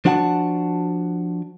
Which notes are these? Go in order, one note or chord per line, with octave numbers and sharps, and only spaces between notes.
F3 D4 F#4 F#5 G5 A5